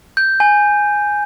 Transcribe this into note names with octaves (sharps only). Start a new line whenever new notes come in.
G6
G#5